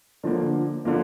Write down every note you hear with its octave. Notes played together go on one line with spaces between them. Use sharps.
D3 F3 A#3
D3 F3 A#3